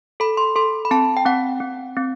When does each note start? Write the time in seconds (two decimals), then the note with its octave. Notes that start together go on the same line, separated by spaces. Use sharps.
0.20 A4 B5
0.37 C6
0.56 A4 C6
0.85 B5
0.91 C4 A5
1.17 G5
1.25 C4 F#5
1.60 C4
1.97 C4